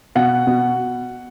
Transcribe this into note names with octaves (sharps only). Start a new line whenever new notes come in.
B2 F#5
B2